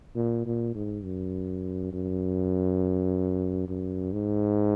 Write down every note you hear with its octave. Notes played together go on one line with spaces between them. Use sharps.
A#2
A#2
G#2
F#2
F#2
F#2
G#2